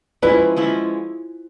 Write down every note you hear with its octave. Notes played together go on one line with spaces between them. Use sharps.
F3 G#3 C#4 E4 B4
F3 G#3 C#4 E4